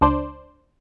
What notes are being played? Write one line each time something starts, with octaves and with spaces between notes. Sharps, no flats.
C#2 D4 C5 D5